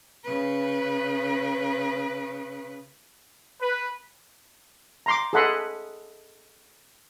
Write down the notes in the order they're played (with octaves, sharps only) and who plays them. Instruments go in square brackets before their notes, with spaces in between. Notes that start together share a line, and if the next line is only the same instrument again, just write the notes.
[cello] C#3 B4
[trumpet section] B4
[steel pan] A#5 C6 D6
G#4 A4 D#5 F#5 B5 C6